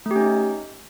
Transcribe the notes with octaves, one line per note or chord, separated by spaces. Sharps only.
A3
G4
C#4
D#4